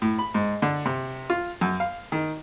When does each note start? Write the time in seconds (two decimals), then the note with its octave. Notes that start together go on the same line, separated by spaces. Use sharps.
0.02 A2
0.19 B5
0.34 G#2
0.62 D3
0.85 C3
1.30 F4
1.61 F#2
1.80 F5
2.12 D#3